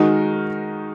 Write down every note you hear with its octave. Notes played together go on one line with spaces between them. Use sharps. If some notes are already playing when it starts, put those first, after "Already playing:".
Already playing: D#3 G#3 D#4 F#4 A#4